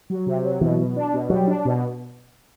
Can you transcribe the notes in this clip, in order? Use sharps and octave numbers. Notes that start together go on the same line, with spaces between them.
F#3
C3
F#3
B2 E3
B2
D4
B2
F#3 G3
D4
B2